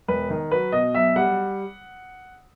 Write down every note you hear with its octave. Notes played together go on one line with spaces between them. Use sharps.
E1 B4
D#3
F#3 B4
B2 D#5
B1 E5
G3 F#5